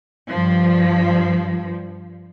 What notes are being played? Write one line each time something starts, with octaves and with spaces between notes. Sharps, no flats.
G2 F3